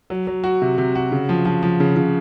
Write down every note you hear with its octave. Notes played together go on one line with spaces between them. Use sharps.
F#3
F#3
F#4
C3
C3
F#4
C#3
F3
F3
F3
C#3
C#3